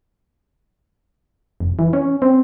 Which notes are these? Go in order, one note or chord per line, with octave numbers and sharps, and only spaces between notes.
F1
E3
C#4
C4